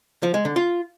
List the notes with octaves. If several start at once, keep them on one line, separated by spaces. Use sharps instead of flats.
F3
G#3
D3
F4